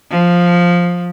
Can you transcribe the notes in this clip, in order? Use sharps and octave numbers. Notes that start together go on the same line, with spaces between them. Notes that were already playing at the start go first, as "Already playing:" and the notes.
F3